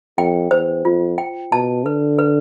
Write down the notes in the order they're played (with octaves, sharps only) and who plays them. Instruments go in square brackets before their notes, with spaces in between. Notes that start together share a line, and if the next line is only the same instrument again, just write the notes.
[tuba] F2 [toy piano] G5
[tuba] E2 [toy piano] C5
[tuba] F2 [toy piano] F4
[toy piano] G5
[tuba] B2 [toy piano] A5
[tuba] D3 [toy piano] B4
[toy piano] B4